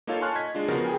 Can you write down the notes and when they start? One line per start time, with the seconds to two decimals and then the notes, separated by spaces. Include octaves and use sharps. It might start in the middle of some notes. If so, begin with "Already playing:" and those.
0.07 A#3 D#4 F4 A4 C#5 F5
0.21 G#5 A5 C6 C#6 F6 F#6
0.35 D#5 G#6 B6
0.55 G#3 D4 F4
0.68 C#3 F3 B3 F4 F#4 A#4
0.85 G#4 G5 G#5